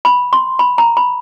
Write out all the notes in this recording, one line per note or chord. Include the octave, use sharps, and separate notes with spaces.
B5
C6
B5
A#5
B5